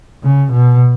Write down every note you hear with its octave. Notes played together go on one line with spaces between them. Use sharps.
C#3
B2